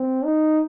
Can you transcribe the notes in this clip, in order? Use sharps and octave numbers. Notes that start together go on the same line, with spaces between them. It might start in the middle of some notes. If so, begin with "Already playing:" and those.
Already playing: C4
D#4